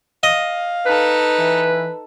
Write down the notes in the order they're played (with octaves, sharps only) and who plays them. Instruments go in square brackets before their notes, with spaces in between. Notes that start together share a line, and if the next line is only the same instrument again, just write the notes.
[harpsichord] D#5 [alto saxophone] F5
[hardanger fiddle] D#4 A4 [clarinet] B4
[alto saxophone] E3